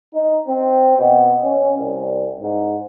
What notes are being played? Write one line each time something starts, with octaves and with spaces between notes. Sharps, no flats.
D#4
C4
B2
C#4
C2
G#2